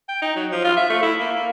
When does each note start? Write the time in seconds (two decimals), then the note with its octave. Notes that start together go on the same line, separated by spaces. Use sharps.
0.09 G5
0.22 D#4
0.36 F#3
0.52 F3
0.64 F4
0.77 E5
0.90 A3
1.02 E4
1.19 A#3
1.36 A#3